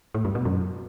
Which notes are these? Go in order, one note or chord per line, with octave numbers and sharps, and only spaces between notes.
A2
G2
B2
F#2